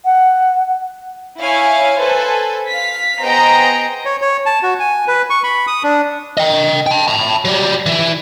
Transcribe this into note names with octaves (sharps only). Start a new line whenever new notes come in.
F#5
E4 C#5 F5 G#5
A4 B4 C5 G#5
F5 B6
B3 G#4 C5 D#5 G5 A#5
C#5
C#5
A5
F#4
G#5
B4
C#6
B5
D#6
D4
D#5 G5
G5 A5
A5 B5
F#3 G3
E3 E4